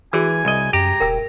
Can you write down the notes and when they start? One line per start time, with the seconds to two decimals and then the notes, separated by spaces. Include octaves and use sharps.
0.13 E3 F#4 G#4 G#5 E6
0.45 C2 D#5
0.73 F#2 G4 A#5
1.00 D#1 A#4 G5 E6